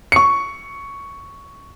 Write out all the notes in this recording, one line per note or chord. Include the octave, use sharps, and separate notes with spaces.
C#6 C#7